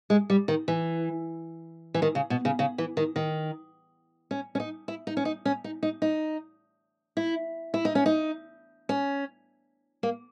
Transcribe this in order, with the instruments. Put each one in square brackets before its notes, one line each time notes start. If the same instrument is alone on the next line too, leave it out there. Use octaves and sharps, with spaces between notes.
[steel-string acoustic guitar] G#3
G3
D#3
E3
E3
D#3
C#3
B2
C#3
C#3
E3
D#3
D#3
C#4
C#4
D#4
E4
D#4
C#4
D#4
C#4
D#4
D#4
D#4
E4
E4
D#4
C#4
D#4
C#4
A#3